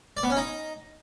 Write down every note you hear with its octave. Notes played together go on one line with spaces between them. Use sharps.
D5
B3
C#4
D#4